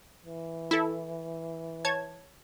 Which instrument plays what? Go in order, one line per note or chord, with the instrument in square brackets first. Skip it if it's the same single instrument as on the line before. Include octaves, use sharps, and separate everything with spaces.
[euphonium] E3
[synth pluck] E4 A4
C#5 A5 G#6